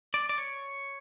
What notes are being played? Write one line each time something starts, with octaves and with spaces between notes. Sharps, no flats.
D5
D5
C#5